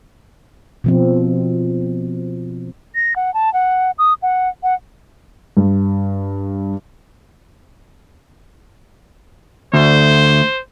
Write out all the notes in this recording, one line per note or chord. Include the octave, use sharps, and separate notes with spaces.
B2 F3 C4
A#6
F#5
A5
F#5
D#6
F#5
F#5
G2
D2 C5